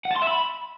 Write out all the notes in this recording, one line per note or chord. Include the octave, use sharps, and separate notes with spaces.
F#5
A5
C6
E5
B5